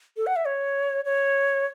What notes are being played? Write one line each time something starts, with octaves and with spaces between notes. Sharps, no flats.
A4
F#5
E5
C#5
C#5